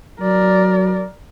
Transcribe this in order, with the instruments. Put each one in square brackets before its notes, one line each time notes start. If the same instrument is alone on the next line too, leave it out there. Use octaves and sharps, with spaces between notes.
[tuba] F#3 [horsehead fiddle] A#4 D5